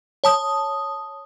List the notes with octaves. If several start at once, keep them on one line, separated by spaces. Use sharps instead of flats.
C#5 A5 D#6